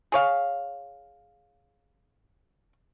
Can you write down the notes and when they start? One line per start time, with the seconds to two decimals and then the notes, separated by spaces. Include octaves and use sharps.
0.12 G#4 C#5 F5